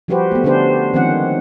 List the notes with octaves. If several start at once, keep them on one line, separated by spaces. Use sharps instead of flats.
F3 G3 F#4 G4 B4 C5
A3 B3
D3 C#4 D4 G4 C5
D#3 F3 G#3 C4 C#4 F#5